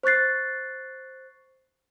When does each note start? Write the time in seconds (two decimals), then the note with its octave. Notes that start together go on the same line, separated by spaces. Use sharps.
0.03 C5 C#6 F#6 A6 C7